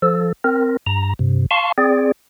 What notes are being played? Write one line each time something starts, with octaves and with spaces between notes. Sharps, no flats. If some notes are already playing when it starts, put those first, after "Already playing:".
F3 A4
C4 A#4
G2 A#5
G2 C3
F5 A5 C6 C#6
C4 G#4 D5